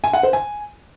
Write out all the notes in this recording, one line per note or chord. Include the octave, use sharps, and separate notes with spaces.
G#5
F#5
C5
G#5